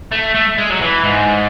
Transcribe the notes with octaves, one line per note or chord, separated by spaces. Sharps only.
A3
A3
G#3
F#3
E3
G#2